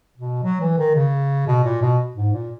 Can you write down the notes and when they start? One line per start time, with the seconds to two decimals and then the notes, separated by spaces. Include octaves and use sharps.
0.18 B2
0.44 F#3
0.61 E3
0.78 D#3
0.96 C#3
1.47 B2
1.64 A#2
1.82 B2
2.16 G#2
2.33 A#2